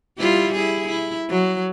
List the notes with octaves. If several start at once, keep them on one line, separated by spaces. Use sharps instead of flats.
G3 E4 F4
E4 G#4
E4
F#3